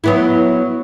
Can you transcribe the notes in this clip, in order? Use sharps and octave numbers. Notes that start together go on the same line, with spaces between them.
F#3 B3 E4